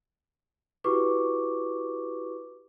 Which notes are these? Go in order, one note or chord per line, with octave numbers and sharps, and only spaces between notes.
E4 F#4 G4 B4 C#6 D6